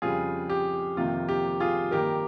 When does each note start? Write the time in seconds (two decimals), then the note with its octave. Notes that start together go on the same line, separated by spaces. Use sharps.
0.02 F2 C#3 G3 F4 G#4
0.50 G4
0.97 F2 C3 D#3 A#3 F4
1.29 G4
1.60 F4 G#4
1.91 G2 D#3 A#3 G4 A#4